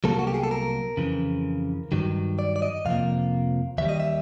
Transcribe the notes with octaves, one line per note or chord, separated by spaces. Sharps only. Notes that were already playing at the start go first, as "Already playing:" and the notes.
C2 B2 F#3 A#3 A4
F#4
G4
G#4
A4
A#4
F2 C#3 E3
G2 D#3 F#3
D5
D5
D#5
F2 C3 F3 A#3 F5
D#2 D#3 G3 E5
D#5
E5